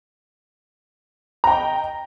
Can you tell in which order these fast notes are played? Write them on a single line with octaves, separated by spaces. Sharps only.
A#5 G5 D#5